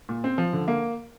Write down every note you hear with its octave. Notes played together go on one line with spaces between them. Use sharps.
A#2
C4
F3
D3
A#3